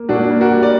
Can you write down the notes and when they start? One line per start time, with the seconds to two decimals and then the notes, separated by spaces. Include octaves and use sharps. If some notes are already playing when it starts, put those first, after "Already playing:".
Already playing: A#3
0.09 A#2 D4 F#4
0.31 A#3
0.41 F#4 A#4
0.51 G3
0.63 D5